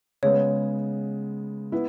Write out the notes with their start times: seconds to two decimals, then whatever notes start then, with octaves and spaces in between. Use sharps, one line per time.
0.23 C#3 G#3 B3 C#5
1.72 B3 E4